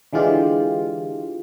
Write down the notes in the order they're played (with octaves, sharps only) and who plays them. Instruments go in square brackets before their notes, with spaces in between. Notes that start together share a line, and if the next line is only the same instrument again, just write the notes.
[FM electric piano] D3 E3 G#3 F4 G4